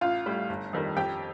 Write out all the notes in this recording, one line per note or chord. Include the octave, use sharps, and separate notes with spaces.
A1 F4 F5
A2 G3
G1
F2 D#3 G3
F2 G4 G5